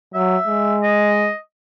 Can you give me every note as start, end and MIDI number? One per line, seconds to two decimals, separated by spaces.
0.14 0.37 54
0.14 0.76 76
0.47 1.30 56
0.83 1.36 75